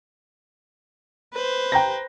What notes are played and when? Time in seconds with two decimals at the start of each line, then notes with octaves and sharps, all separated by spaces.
1.33 B4 C5
1.72 G5 A#5 A#6